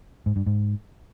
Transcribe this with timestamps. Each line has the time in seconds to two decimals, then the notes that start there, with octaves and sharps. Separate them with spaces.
0.26 G#2
0.36 G2
0.46 G#2